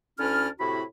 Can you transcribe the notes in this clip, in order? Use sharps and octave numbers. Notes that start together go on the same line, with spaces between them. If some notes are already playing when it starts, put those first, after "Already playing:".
D2 D3 C#4 E4 A5 F6
A2 C3 E4 F#4 B5